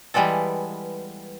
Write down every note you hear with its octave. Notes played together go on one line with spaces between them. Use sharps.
E3 G3 G#3 B3 A4